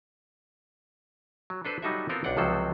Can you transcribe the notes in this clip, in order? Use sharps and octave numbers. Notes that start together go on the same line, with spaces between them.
F#3
D4 A4 B4 C5
F#3 G3 D#4 F#4 A4 E5
B3 C4 F4 A4 A#4
B1 D4 F4 D5 F#5 G5
C#2 C3 F3 F#3 A4 C5